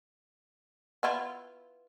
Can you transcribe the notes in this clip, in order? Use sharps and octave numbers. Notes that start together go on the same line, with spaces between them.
B3 E4 F4